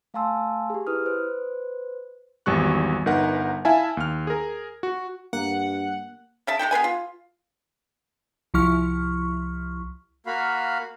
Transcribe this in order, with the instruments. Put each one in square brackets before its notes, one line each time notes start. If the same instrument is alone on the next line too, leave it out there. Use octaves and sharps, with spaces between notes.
[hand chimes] A3 F5 G#5 A5 C6 E6
G4 G#4
E4 B4 D#6 F6
B4 C5
[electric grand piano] G#1 E2 G3 C#6 F#6
G1 D#4 A#4 B4 F#5
E4 E5 F5 G#5 A5
D#2 F6
G#4 A#4
F#4
[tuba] G2 [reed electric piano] A#3 [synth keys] F#5
[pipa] C#3 E5 A5
G#3 D#4 A4 G5
B3 G#4 B4 G#5
F4
[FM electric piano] C2 F3 E4 C#6 F6
[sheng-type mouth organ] A#3 F#4 F5 B5